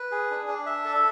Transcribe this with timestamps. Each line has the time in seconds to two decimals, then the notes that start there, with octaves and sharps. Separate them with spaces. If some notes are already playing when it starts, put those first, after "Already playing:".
Already playing: B4
0.11 G#4
0.30 D4
0.48 D4
0.66 E5
0.85 A4